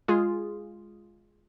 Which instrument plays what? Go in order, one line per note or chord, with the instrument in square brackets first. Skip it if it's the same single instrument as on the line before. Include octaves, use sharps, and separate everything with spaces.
[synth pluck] G#3 F4 G#4